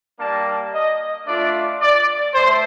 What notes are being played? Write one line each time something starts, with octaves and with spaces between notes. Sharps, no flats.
G3 A#3 D4 A5
D#5
A3 D4 F4 D5
D5
A3 C5